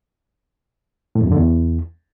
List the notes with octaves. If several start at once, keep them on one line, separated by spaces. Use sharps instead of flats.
A2
E2
F#2
D3
E2